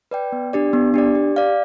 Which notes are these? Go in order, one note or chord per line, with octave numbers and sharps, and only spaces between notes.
B4 D5 G5
B3
D4 G4 D5
B3
D4 G4 D5
G4
D5 F5